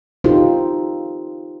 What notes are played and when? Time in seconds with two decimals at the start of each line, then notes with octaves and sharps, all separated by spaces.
0.24 D#4 F4 G4 A4 C5